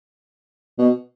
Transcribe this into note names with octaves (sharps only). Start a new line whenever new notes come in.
B2